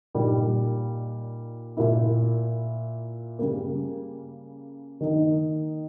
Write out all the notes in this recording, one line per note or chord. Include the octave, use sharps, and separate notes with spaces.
A#2 G3 A#3 D#4
A#2 A#3 E4
C#3 G3 A#3
D#3 A#3 D#4